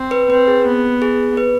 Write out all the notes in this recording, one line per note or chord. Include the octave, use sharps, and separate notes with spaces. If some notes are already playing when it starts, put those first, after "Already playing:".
Already playing: C4
B4
C4 B4
G#4
B3
G#4
B4